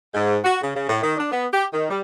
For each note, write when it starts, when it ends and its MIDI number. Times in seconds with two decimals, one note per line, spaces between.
0.14 0.37 44
0.44 0.58 66
0.62 0.74 49
0.75 0.87 49
0.88 0.99 45
1.03 1.14 51
1.17 1.32 62
1.32 1.46 59
1.52 1.64 67
1.72 1.86 51
1.89 2.01 55